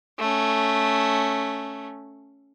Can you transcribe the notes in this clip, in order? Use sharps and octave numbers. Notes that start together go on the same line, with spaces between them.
A3 C#4